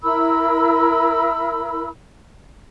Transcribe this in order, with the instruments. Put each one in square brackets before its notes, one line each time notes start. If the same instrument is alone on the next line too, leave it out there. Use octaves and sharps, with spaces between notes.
[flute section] E4 A#4 B5 E6